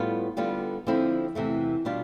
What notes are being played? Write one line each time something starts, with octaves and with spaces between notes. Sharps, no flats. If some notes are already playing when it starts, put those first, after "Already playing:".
Already playing: A2 G3 B3 F4
D3 G3 B3 F4
D3 F3 C4 E4
E2 C3 E3 A3
B2 G3 D4 F4